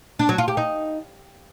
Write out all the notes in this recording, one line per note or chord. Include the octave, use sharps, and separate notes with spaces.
D4
F#3
F4
G4
D#4